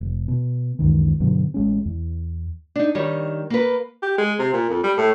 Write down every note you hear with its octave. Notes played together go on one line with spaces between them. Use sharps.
F1
B2
C#2 F#2 D#3 E3
G2 B2 D3 F#3
A1 G#3 C#4
E2
D4 D#4
D#3 G3 C#5
A#3 B4
G4
G#3
C3
A#2
F2
G3
A2